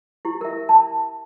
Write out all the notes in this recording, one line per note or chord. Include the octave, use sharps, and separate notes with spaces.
E4 G4
A#4 E5
A5